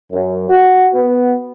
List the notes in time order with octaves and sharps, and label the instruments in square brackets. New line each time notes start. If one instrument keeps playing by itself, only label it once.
[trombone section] F#2
F#4
B3